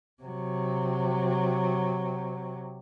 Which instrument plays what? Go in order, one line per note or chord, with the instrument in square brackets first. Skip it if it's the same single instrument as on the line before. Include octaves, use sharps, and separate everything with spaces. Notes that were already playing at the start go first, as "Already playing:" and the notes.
[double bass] C3 F#3